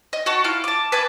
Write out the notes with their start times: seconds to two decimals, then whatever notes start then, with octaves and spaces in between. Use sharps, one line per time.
0.13 D#5
0.26 F#4 A5 C#6
0.44 E4 F4 F6
0.64 A5 D6
0.92 B4 G#5 A5 D6